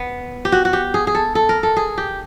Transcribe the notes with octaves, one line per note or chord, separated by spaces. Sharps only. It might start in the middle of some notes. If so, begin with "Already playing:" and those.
Already playing: B3
G4
F#4
F#4
G4
G#4
G#4
A4
A4
A#4
A4
G#4
G4